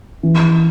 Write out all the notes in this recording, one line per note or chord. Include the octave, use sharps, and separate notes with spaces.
E3